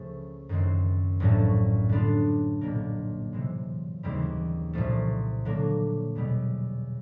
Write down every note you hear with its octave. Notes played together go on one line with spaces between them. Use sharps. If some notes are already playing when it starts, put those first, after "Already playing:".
Already playing: C#2 C#3 F3 A3
F#2 D#3 G#3 C4
A#1 A2 F#3 A3
D3 G3 B3 D4 F4
B1 A#2 F#3 A#3 D4
C3 E3 G#3
D#2 C#3 E3 G3 C4
C2 A#2 F3 A3
D3 F#3 A#3
E2 B2 G3 B3